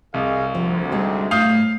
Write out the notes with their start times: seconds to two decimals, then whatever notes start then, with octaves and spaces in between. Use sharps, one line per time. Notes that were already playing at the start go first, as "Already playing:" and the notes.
0.14 C2 G#4 D#5 F5
0.55 D2 C3 F3
0.91 G3 G#3 D#4
1.31 A2 A3 F5 D#6 G6